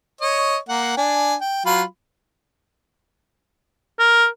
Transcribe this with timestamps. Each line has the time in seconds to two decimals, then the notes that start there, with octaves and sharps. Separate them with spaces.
0.21 C#5 D#5
0.69 A#3 F#5
0.97 D4 G#5
1.41 G5
1.66 F#3 F4 B5
3.99 A#4